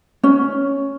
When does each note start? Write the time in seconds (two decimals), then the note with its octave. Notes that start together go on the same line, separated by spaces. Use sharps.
0.23 C#4